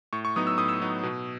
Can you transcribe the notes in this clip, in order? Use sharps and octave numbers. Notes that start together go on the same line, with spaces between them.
A2 C#6
C#6
F#3 B3 D#4 D#6
E6
A2 D#6
E6
F#3 B3 D#4
B2